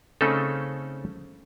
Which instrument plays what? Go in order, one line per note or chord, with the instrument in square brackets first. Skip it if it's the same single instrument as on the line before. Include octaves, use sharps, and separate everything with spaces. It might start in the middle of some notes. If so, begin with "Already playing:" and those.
[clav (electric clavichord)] C#3 A3 C4 C#4 D#4 A4